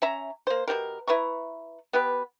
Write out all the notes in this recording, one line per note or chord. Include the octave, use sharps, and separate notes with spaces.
C#4 E5 A#5
A#3 C5
B2 F3 G4 A#4
E4 B4 A#5 C#6
B3 G4 B4